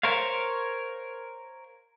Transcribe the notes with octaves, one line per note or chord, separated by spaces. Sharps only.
A#4 C5 C#5 F5